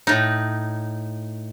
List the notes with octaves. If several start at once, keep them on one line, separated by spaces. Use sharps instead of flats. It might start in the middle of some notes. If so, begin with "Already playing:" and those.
A2 D#4